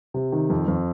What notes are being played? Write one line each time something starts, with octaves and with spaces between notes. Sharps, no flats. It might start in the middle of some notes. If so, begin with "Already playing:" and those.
C3
D#3
F2
F2